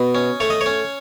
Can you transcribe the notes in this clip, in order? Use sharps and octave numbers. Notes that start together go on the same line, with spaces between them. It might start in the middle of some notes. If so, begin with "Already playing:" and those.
Already playing: B2 D#5
C#4
A3 C#5
D#5
C#5
C#4